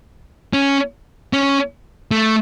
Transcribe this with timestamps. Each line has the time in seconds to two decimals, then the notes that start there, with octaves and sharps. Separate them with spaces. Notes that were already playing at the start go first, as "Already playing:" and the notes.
0.53 C#4
1.33 C#4
2.11 A3